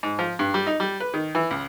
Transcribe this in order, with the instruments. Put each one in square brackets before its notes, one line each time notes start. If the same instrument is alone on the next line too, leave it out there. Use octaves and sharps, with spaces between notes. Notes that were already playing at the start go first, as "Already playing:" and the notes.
[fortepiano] G#2
F3
G2
G3
D#4
G3
B4
D#3
E3
C#2